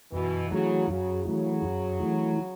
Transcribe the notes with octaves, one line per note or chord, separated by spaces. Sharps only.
F#2 B2 E3
C#3 E3 F#3 A3 E4
F#2 C#3 F#3
C#3 E3 F#3 A3 E4
F#2
E3 A3 E4